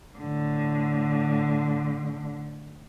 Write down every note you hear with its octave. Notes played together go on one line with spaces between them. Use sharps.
A2 D3